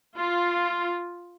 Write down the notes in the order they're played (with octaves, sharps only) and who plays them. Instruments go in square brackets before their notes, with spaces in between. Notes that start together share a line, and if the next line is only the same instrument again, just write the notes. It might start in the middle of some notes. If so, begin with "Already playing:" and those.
[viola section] F4